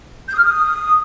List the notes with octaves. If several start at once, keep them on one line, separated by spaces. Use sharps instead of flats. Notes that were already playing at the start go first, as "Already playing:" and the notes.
G6
D#6
F6
D#6